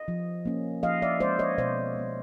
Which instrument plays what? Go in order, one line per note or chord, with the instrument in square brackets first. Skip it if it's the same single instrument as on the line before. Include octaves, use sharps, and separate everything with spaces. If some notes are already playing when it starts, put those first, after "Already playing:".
Already playing: [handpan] D#5
F3
A#3 C#4
F3 D#5 F5
D5 E5
G#3 C#4 C5 D5
C#5 D#5
B2 C5 D5
G#3 B3